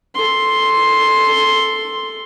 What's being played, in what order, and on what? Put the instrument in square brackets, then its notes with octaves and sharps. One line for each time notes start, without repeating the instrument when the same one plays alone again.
[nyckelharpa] A4 C6